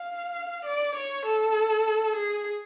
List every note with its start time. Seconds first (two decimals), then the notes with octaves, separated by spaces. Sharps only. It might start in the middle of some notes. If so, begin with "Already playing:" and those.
Already playing: F5
0.65 D5
0.95 C#5
1.25 A4
2.16 G#4